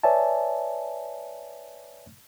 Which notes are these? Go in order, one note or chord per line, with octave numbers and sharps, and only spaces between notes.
B4 C#5 D5 E5 G#5 A5